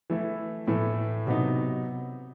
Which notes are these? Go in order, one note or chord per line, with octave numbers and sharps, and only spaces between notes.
E3 A3 E4
A2 E3 A3
C3 F#3 B3 D#4